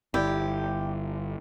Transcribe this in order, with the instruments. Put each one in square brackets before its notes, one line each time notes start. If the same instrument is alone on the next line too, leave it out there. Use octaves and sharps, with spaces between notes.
[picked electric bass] G1 [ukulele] E4 D5 [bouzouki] G4